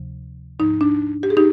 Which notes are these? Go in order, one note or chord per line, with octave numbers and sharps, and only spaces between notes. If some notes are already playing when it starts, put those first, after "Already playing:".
Already playing: D2 C3 F3
G#2 F3 D#4
D4
G4
G#4
D#4 G4